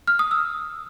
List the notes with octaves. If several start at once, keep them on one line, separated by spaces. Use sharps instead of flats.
F6
D#6
E6